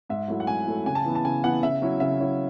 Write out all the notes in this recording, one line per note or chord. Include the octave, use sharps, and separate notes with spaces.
G#2 E5
F#3 A3 E4
F#5
G#2 G#5
F#3 A3 E4
C#3 G#5
A5
E3 B3 E4
A5
C#3 G#5
E3 B3 E4 F#5
C#3 E5
F#3 C#4 E4
C#3 E5
F#3 C#4 E4